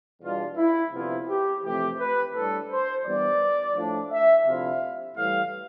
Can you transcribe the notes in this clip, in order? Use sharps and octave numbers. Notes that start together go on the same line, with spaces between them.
E2 B2 G3 D4 F4
E4
D2 C3 F3 B3 E4 F4
G4
F2 C3 E3 A3 G4
B4
A2 G3 D4 A4
C5
G2 E3 G3 B3 D5
A2 F3 A3 D4
E5
D2 C3 F3 C4 E4 F5
A2 E3 G3 F5